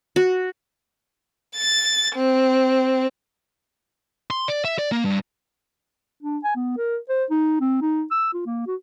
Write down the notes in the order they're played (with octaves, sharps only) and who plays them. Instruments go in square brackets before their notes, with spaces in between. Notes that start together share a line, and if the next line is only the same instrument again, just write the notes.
[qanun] F#4
[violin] A6
C4
[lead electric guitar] C6
D5
E5
D5
A#3
G2
[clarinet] D4
G#5
B3
A#4
C5
D#4
C4
D#4
E6
F4
A#3
F#4